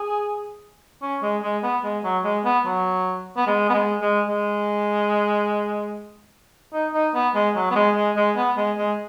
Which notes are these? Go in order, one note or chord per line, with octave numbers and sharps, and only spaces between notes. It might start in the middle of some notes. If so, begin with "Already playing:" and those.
Already playing: G#4
C#4
G#3
G#3
B3
G#3
F#3
G#3
B3
F#3
B3
G#3
B3
G#3
G#3
G#3
D#4
D#4
B3
G#3
F#3
B3
G#3
G#3
G#3
B3
G#3
G#3